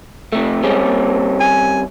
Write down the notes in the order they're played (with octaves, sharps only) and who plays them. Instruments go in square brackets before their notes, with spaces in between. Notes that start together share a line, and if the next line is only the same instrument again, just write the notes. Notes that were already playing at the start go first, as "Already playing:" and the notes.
[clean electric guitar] C3 A3
[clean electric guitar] G3 C4 C#4 [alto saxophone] G#3
[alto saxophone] A#3
G#5